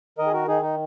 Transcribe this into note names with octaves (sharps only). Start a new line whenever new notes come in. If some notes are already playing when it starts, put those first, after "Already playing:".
D#3 A#4 D#5
G#4
F#4 A#4
D#3 D#4 G#4
D#4